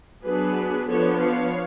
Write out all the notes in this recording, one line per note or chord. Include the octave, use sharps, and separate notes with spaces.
F#3 B3 D4 G#4 B4
F3 B3 D4 A4 C#5
C#5 F5